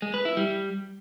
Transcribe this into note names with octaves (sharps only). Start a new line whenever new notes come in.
G#3
B4
E4
G3